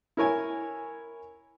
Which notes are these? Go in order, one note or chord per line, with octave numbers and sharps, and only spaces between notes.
E4 A#4 C#5 G#5